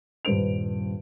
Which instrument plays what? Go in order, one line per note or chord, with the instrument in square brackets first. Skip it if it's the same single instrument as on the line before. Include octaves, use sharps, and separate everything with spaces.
[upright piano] D#1 G2 B4 C5 D7 F7